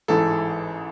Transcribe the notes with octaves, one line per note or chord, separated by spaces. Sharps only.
A1 G#2 E3 A4